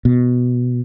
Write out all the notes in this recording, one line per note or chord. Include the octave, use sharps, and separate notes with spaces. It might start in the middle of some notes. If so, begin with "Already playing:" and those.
B2